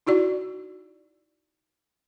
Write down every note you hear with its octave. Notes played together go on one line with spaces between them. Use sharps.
D#4 E4 F#4 D5